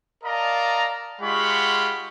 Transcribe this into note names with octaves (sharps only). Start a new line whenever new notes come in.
A#4 D5 D#5 F5 A5 A#5
G#3 F4 G4 F#5 B5 C#6